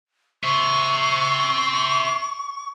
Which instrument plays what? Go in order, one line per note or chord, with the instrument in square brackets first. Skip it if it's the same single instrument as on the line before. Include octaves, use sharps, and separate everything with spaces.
[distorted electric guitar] C5 E5 [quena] C#6